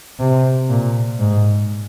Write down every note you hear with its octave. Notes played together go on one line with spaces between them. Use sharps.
C3
A#2
G#2